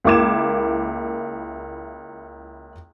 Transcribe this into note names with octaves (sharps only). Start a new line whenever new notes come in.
C#2 A#3 E4 D6 G#6 E7